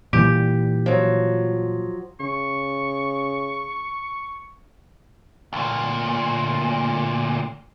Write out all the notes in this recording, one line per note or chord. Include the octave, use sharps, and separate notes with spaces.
A#2 E3 G3 G4
F3 F#3
C#3 C#6
D2 A#2